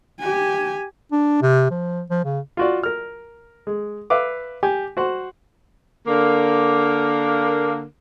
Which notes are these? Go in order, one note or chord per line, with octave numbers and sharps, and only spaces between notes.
G4 G#5
D4
C3
F3
F3
C#3
F4 F#4 D5
A#4 F6
G#3
B4 E5 F5 D6
G4 G#5
F#4 C5 F#5 C6
D3 A#3